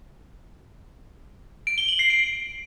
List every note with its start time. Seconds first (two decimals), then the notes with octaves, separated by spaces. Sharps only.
1.67 D7
1.78 G7
1.88 F#7
1.99 C7
2.10 D7